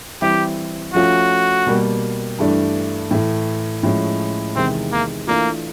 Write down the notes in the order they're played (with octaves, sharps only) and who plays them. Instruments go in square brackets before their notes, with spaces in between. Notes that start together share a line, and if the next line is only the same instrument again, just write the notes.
[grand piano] E3 G3 C4 E4 [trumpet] G4
[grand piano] F3 A3 C#4 F4 [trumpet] F#4
[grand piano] B2 G3 A#3
G2 E3 A3 D4
A2 E3 A3
A2 F3 G#3 C#4
[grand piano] E2 C3 D#3 G#3 [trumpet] C4
[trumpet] A#3
[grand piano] E3 A3 D4 F4 [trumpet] A#3